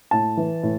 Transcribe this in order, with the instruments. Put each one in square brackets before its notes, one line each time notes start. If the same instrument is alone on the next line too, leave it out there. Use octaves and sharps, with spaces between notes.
[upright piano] A2 A5
E3
A2